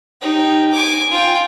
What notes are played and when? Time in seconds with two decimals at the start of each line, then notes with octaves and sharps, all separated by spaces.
0.21 D#4 G4
0.72 G#5 D6
1.12 F4 G5